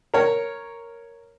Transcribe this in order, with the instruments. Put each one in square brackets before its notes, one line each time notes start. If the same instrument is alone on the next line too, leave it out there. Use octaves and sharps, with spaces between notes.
[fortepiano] A#4 C#5